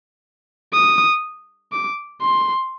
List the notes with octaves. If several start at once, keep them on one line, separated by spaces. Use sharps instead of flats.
D#6
D6
C6